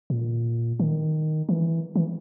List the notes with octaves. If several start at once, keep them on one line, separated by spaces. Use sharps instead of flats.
A#2
D#3
E3
E3